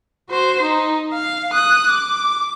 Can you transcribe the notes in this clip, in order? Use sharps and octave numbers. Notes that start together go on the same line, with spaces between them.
F#4 C5
D#4
F5
D#6 F#6
D6